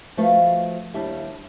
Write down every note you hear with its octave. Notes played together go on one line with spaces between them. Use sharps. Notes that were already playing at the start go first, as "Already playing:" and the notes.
F3 A3 F4 F#4 B4 F5
D#2 G3 D4 E4 G4 E5